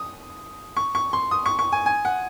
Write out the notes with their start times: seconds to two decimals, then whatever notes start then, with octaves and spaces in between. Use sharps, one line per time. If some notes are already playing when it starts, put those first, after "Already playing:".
Already playing: D#6
0.77 C#6
0.95 C#6
1.13 C6
1.31 D#6
1.46 C#6
1.59 C#6
1.72 G#5
1.86 G#5
2.05 F#5